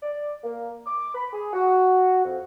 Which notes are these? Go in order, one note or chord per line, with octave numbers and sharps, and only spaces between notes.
D5
A#3
D6
B5
G#4
F#4
F2